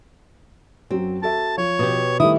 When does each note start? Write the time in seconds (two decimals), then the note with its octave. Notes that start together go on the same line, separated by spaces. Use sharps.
0.91 F#2 F#3 C4
1.23 F#4 A4 E5 A5
1.57 F3 C#5
1.79 B2 G4
2.20 D#3 G3 A3 E4 D#6